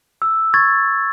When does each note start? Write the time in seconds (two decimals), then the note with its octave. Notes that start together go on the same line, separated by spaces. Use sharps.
0.22 E6
0.54 C#6 G#6 A6